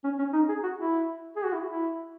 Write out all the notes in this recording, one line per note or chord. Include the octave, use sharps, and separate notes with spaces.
C#4
C#4
D#4
G#4
F#4
E4
G#4
F#4
E4
E4